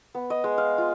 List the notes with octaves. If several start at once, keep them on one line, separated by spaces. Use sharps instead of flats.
B3
D#5
G#3
F5
F4